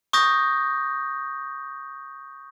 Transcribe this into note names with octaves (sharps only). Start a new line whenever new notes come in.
C#6 D#6 G6 A#6